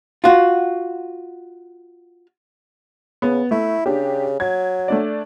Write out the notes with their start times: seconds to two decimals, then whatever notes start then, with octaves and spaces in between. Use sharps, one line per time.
0.24 F4 F#4
3.22 C#3 B3
3.51 A3 E4
3.86 C#3 D4 G4
4.40 F#3 G#6
4.88 A3 D4 D5